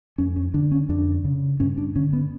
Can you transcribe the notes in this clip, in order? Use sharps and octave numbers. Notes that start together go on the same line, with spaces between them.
F2 C#4
C#4
D3 D4
C#4
F2 D4
C#3
G2 C#4
D4
D3 C#4
B3